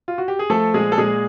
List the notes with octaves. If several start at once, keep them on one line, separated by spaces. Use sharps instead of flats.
F4
F#4
G4
G#4
F3 A3 A4
A#2 G#3 G#4
A4
A#2 G#3 G#4